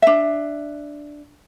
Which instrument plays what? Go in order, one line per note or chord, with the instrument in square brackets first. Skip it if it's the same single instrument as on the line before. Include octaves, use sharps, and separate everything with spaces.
[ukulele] D4 E5